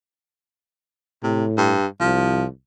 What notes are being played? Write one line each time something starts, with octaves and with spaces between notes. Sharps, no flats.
A2 C3
G2
C2 F3